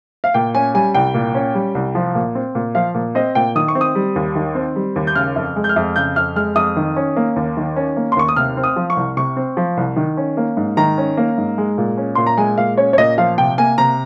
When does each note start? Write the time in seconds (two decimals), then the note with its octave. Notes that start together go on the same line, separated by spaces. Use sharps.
0.24 F5
0.34 A#2 G5
0.55 C#4 G#5
0.74 G3 G#5
0.94 C2 G5
1.14 A#2
1.35 C#4
1.54 G3
1.75 C2
1.95 F3
2.15 A#2
2.35 C4
2.55 A#2
2.75 F3 F5
2.95 A#2
3.15 C4 D#5
3.35 A#2 G5
3.55 D#3 D#6
3.68 C#6
3.75 C4
3.81 D#6
3.95 G3
4.16 D#2
4.35 D#3
4.55 C4
4.76 G3
4.96 D#2
5.07 G6
5.15 C#3 F6
5.36 F2
5.56 G#3
5.64 G6
5.69 F6
5.76 F2
5.96 C#3 G6
6.16 F2 F6
6.36 G#3 F6
6.56 F2 D#6
6.76 D#3
6.96 C#4
7.16 A#3
7.36 D#2
7.57 D#3
7.76 C#4
7.96 A#3
8.12 C6
8.16 D#2 C#6
8.29 D#6
8.36 C3 F6
8.57 C4
8.64 D#6
8.76 F3
8.90 C#6
8.97 C2
9.17 C3 C#6
9.37 C4
9.57 F3
9.77 C2
9.96 D#3
10.17 C#4
10.37 A#3
10.57 G#2
10.77 D#3 A#5
10.98 C#4
11.17 A#3
11.38 G#2
11.58 G#3
11.78 A#2
11.97 C#4
12.15 A#2 C6
12.26 A#5
12.37 G#3 G#5
12.58 A#2 F5
12.77 C#4 C#5
12.93 C#5
12.98 A#2 D#5
13.18 F3 F5
13.38 C3 G5
13.58 A#3 G#5
13.78 C3 A#5